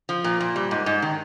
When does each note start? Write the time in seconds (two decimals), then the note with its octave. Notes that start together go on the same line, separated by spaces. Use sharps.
0.09 F3
0.24 A#2
0.40 A#2
0.56 G3
0.71 G#2
0.86 G#2
1.02 D#3